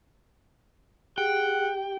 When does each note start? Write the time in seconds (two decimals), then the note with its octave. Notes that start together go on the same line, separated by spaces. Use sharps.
1.18 G4 G#4 F#5 G5